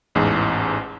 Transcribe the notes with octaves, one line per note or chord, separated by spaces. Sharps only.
A1 E2 G#2